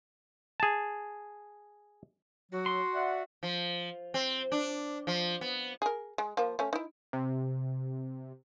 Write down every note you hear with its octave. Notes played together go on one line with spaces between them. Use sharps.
G#4 A5
F#3 F#4
C6
D5 E5 F#5
F3
C4
D4
F3
B3
G#4 A#4
G#3
F3 A#3
A3 C#4
D#4 E4
C3